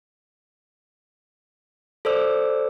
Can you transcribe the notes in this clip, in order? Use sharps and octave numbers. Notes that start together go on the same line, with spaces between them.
A4 C5 D5 E6